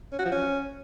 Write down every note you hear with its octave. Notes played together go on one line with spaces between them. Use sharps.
C#4
F#4
F3
C#4